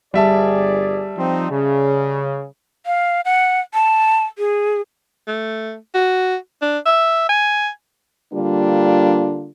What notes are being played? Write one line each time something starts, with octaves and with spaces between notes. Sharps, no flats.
G1 G3 G#4 D5 E5 A5
F3 C4 D#4
C#3
F5
F#5
A5
G#4
A3
F#4
D4
E5
G#5
D3 G3 A#3 D4 F4